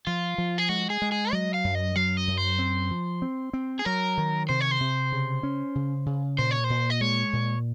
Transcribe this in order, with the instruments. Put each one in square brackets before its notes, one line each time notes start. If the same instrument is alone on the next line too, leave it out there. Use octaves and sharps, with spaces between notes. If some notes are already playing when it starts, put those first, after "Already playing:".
[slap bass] F3 [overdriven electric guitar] F4
[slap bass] F3
[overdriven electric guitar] G#4
[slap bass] G#3 [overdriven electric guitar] F#4
[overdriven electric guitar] G#4
[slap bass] G#3
[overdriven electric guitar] G#4
[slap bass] F#3 [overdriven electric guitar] D#5
[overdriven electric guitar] F5
[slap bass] F#2
[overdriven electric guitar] D#5
[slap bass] F#3 [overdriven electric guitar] F5
[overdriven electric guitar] D#5
[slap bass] F#2
[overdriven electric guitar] C5
[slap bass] C4
F3
C4
C4
[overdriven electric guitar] G#4
[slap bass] F#3 [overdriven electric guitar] A#4
[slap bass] D#3
[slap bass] C3 [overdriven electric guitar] C5
[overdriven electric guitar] C#5
C5
[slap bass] C3
C#3
C#4
C#3
C#3
[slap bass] A#2 [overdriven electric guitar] C5
[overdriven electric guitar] C#5
C5
[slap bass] A#2
[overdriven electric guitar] D#5
[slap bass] G#3 [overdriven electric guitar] C#5
[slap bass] A#2